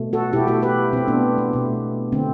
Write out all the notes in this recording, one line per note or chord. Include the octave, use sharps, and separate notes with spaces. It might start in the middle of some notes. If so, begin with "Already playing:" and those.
Already playing: B2 A3
F#4 A4
B2 A3 E4 G4
F#4 A4
G4 B4
B2 A3 C4
B3 D4
B3
B2 A3
D3 A3 C4